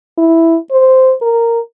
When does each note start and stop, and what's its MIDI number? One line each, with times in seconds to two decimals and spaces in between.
0.18 0.57 64
0.71 1.13 72
1.22 1.60 70